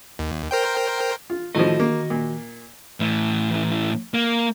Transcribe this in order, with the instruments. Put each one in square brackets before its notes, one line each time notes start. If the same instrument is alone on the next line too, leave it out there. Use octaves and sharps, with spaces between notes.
[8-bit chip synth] D#2
A#4 C5 G5
[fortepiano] F4
[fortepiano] A2 F3 [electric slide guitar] D#3 F#4 D#5
[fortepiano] A#3
A#2
[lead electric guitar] A2 E3
A#3